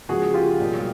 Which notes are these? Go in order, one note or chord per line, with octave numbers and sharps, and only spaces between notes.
C#2 C#3 F3 A#3 F#4 G#4
F4 G4
B1 B2 G3 A#3